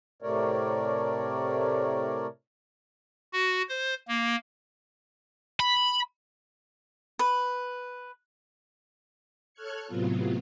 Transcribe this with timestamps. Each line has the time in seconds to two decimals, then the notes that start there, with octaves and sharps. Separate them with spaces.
0.22 A2 C3 A3 A#4 C#5 D5
3.33 F#4
3.69 C5
4.08 A#3
5.60 B5
7.19 B4
9.54 A4 C#5 F6 F#6 G#6 C#7
9.87 A2 C3 F#3 B3 F4